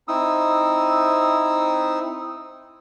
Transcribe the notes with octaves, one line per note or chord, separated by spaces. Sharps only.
C4 D#4 E4 D#6 E6